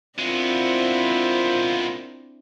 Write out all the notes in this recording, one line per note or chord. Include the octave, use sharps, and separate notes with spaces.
G#3 B3 C4 D4 E4 F4 A#4 C5